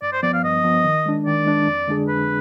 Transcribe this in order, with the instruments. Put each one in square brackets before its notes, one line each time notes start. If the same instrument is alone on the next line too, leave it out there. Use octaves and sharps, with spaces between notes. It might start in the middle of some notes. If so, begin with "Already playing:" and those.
[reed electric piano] G2 [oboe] D5
[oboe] C5
[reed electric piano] F3 B3 [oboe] D5
[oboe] F5
[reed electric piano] G2 [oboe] D#5
[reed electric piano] F3 B3
D#3
G#3 D4
[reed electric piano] D#3 [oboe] D5
[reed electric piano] G#3 D4
F2
D3 G#3 D4 G#4
[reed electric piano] F2 [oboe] B4